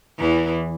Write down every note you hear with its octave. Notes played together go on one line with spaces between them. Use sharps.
E2 E3